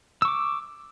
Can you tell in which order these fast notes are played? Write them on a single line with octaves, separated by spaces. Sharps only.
E6 C#6 D6